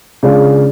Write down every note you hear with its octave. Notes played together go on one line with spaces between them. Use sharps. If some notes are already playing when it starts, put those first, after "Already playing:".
C#3 G#3 D4 F4